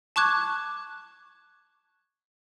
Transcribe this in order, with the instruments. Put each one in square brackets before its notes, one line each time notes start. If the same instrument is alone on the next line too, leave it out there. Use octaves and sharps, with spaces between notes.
[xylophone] A5 C#6 D6 F#6 G#6